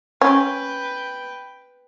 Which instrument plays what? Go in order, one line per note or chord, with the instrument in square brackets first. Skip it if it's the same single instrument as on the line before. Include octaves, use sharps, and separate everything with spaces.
[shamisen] C#4 [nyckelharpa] B4 G5